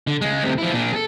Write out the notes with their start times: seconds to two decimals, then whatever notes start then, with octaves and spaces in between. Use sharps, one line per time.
0.07 D3
0.21 C#3 G#3
0.43 D2 C3
0.58 F3 E4
0.73 A#2 D4
0.93 G#4 A4